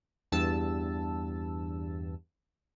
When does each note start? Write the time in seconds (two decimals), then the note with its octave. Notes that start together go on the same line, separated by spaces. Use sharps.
0.32 E2 G2 A5 E6